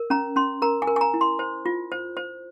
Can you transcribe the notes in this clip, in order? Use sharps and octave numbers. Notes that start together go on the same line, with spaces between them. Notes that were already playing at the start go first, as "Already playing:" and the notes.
Already playing: A#4
C#4 A#5
C#4 C6
A#4 A#5
G#5
A#4
G#5
A#5
E4
C6
C5
F4
C5
C5